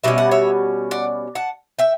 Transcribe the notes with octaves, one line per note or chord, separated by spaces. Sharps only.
B2 G3 C#4 E5
F#5
C#5 E5
D5 F#5
F#5 A5
E5 G5